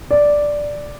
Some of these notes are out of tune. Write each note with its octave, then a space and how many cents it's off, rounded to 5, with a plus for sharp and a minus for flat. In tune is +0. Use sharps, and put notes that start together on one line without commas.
D5 +0